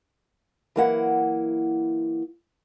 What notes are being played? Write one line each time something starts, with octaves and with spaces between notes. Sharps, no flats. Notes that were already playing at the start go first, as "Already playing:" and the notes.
E3 F#3 A#3 E4 F#5